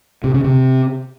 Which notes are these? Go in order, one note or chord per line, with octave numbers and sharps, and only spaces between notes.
C3
C#3
C3